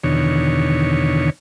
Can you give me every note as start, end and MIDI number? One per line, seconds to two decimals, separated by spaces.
0.04 1.30 40
0.04 1.30 47
0.04 1.30 50
0.04 1.30 51
0.04 1.30 73